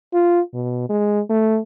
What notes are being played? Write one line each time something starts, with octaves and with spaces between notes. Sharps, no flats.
F4
B2
G#3
A3